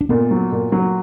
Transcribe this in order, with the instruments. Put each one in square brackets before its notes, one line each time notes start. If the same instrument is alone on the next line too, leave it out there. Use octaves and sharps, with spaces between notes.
[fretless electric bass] D4
[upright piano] A#2 [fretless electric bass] B3
[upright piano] F#3
A#2
F#3